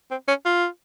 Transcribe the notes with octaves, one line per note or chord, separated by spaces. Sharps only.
C4
C#4
F4